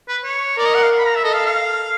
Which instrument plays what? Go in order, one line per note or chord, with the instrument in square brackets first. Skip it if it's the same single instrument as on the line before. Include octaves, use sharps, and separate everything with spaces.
[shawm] B4
C#5
[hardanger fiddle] A#4 [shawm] D5
[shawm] D#5
F#5
F5
B5
A#5
E5
[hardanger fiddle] A4 [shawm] D#5
[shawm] F5
F5